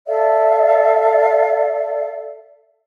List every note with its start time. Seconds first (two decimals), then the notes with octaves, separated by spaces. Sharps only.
0.06 A4 D5 E5 F5